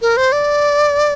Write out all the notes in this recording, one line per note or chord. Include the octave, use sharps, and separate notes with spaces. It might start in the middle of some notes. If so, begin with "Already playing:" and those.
A#4
C5
D5